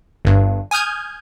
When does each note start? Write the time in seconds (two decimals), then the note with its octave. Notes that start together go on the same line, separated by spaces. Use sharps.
0.25 G1 G2
0.71 G#5 D#6 F6 G6 G#6